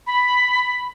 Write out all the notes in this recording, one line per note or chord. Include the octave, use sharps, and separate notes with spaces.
B5